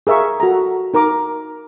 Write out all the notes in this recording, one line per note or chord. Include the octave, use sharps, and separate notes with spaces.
G#4 A#4 E5 F5 C#6
F#4 A4 A#5
D#4 A#4 A#5 D6